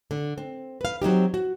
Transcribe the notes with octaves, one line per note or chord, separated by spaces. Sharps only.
D3
C4
B4 F5
F#3 C4 D#4 G4
F#4